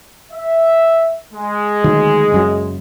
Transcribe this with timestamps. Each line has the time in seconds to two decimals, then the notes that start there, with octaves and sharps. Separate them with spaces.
0.32 E5
1.33 G#3
1.84 D2 D#3 F#3
2.32 F#1 F#2 F#3